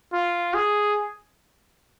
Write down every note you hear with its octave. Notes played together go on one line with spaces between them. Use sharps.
F4
G#4